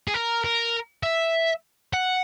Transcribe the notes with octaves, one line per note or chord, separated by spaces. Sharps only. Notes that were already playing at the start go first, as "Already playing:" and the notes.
G#4
A#4
A#4
E5
F#5